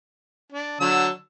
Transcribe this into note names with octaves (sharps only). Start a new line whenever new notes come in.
D4
D3 F#3 E6